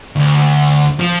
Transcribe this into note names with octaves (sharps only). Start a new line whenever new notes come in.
D2
F3